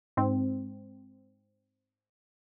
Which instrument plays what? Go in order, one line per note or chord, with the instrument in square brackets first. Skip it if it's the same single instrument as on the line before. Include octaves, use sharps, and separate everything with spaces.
[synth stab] G#2 C4